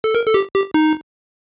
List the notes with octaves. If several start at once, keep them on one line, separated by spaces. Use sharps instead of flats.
A4
A#4
A4
G4
G4
D#4